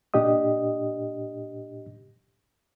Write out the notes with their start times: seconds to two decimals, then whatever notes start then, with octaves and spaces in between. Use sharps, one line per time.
0.14 A#2 D4 G4 D#5 D#6